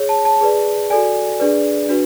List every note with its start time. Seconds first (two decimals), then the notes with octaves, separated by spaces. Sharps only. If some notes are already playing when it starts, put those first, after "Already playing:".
Already playing: G#4 C#5
0.09 A5
0.25 A5
0.41 G#4 B4 D5
0.90 F#4 A4 D5 G#5
1.40 D4 G#4 B4 D5
1.89 D4 F#4 B4